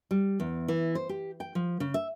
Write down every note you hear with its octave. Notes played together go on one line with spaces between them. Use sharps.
G3
E2
E3
C5
G4
G5
F3
C#3
E5